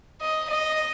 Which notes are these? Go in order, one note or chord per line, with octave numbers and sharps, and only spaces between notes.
D#5
D#5